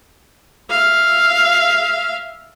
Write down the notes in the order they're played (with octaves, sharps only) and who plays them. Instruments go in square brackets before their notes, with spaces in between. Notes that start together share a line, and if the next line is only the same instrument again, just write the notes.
[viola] E5 F5